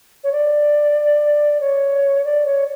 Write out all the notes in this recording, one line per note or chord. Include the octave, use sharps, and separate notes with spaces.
C#5
D5
C#5
D5
C#5